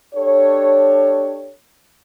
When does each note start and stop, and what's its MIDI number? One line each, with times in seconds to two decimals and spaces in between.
0.15 1.52 62
0.15 1.52 67
0.15 1.52 69
0.15 1.52 73